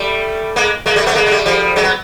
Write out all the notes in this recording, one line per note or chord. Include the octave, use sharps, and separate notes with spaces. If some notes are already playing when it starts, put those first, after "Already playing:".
Already playing: G3 A3
G#3 A#3
G#3 A#3
G3 A3
A3 B3
G#3 A#3
G#3
G3 A3
F3 G3
F#3 G#3
B3